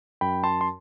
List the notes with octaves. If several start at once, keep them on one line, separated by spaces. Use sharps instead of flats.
F#2 G5 B5
A5 C6
C6